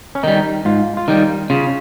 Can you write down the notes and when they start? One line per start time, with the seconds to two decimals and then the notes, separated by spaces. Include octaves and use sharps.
0.15 C#4
0.23 D#3 G3 D#4
0.65 G#2 F4
0.97 F4
1.08 D#3 G3 D#4
1.50 C#3 F4